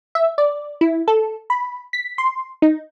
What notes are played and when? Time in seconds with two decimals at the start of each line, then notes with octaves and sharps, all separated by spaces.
0.15 E5
0.38 D5
0.81 E4
1.08 A4
1.50 B5
1.93 B6
2.18 C6
2.62 D#4